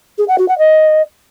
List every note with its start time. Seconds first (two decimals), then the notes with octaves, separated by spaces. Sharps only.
0.18 G#4
0.28 F#5
0.38 F#4
0.48 F#5
0.58 D#5